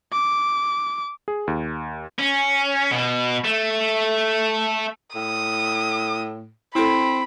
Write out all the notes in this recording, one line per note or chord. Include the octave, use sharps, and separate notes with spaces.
D6
G#4
D#2
C#4
B2
A3
A2 D#6
C4 E4 A4 B5